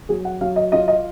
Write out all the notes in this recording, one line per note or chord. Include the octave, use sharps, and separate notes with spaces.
F#3 G#4
F#5
F#3 F5
D#5
F4 D#5
D#5